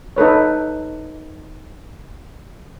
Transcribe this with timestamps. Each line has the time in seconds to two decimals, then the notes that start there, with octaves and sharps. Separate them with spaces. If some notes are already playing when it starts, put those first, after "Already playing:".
0.16 D#4 A4 B4 C#5